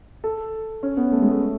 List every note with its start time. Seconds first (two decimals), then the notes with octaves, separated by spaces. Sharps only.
0.24 A4
0.83 C#4
0.97 B3
1.12 A3
1.22 G#3
1.31 A3